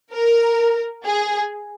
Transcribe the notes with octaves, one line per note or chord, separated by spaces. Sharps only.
A#4
G#4